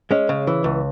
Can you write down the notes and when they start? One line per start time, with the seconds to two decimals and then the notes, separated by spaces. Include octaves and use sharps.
0.11 G#3 C#4
0.29 C#3
0.47 E3
0.64 C#2